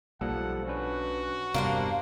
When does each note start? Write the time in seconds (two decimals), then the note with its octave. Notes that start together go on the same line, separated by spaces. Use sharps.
0.21 B1 F3 G3 A#3 A4 F#5
0.67 C#4 D4 F#4 B4
1.54 E1 G2 C3 G3 A#3 B3 D4 C5